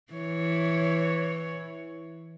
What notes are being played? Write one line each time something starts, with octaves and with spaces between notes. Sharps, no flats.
E3 C#5